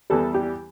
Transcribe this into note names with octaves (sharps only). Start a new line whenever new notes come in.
E2 E3 G3 A4
G4